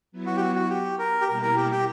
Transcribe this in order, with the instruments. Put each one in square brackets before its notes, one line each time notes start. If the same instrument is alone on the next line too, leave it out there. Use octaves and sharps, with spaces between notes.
[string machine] F#3 B3 E4
[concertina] F#4
G4
F#4
F#4
G4
A#4
G4
[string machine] B2 G3 A#3 E4 [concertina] A#4
[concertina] A#4
G4
G4